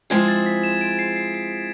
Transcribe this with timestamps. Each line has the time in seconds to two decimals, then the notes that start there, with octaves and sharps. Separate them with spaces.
0.10 F3 G#3 C4 E4 G#4 G#6
0.28 A6
0.46 B6
0.63 E7
0.81 D7
0.99 C7
1.16 C7
1.34 C7